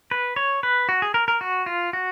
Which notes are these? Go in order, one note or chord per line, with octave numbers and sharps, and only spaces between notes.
B4
C#5
B4
F#4
G#4
A#4
A#4
F#4
F4
F#4